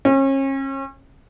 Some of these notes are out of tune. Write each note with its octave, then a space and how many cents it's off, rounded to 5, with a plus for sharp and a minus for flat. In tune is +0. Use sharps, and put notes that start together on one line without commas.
C#4 -35